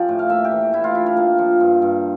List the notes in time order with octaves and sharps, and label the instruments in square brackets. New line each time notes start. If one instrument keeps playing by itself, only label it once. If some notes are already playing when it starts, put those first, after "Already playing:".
Already playing: [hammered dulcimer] F3 C#4 G4 A4 D5
A2
F5
A#3 E5
G4
E3
A2 E4
F4
D4 E4
F4
A#3
F3
G2
G2